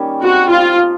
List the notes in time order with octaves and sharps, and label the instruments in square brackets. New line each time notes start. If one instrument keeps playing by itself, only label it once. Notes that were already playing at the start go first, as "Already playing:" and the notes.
Already playing: [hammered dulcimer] D#3 G3 A#3 C#4
[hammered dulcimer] C4 [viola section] F#4
[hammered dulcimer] F3 [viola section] F4
[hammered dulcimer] F3